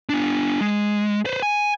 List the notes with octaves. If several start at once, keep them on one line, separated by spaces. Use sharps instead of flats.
B3 D4
G#3
B4 C5
G#5